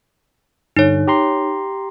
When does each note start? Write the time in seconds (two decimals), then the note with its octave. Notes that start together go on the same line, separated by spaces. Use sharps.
0.76 G2 D3 D#4 C#5
1.07 G4 A#5 C6